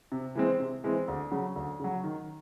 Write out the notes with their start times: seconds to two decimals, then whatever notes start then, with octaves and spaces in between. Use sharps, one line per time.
0.12 C3
0.35 E3 G#3 C4
0.60 C3
0.84 E3 G#3 C4
1.08 D2
1.31 C#3 F#3
1.56 D2
1.80 C#3 F#3
2.04 D#3